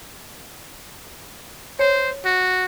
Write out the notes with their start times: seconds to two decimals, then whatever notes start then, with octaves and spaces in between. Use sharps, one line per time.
1.79 C5 C#5
2.25 F#4